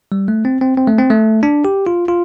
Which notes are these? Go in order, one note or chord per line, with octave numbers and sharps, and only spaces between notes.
G3
A3
C4
C4
C4
A3
C4
A3
D4
G4
F4
F4